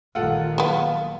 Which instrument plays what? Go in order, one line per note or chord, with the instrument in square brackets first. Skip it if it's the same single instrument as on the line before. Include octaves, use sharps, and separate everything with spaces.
[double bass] A#1 D#3 [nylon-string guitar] G3 A3 [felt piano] F4 A4 F#5
[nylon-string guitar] F#3 A#3 F5 [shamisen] G#3 B3